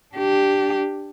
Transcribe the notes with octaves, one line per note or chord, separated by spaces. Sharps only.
D4 G4